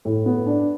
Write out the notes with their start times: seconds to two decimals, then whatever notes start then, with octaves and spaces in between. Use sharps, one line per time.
0.05 A2
0.26 B3
0.47 D4